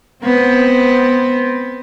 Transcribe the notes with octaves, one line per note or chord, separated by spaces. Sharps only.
B3 C4